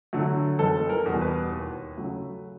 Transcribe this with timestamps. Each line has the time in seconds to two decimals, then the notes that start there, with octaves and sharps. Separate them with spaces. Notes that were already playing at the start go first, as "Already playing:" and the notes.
0.13 D3 F#3 A3
0.59 F#1 A4
0.89 A#4
1.06 E2 B2 G3
1.21 B4
1.51 D#2
1.98 C#3 F#3 A3